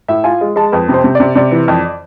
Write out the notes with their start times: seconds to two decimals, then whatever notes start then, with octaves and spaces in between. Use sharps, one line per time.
0.08 A2 E5
0.24 F4 G#5
0.41 G#3
0.56 G#3 A5
0.72 F2 B4
0.89 C3
0.94 C5
1.04 C3
1.15 C3 D5
1.35 C3 D5
1.51 E3
1.68 F2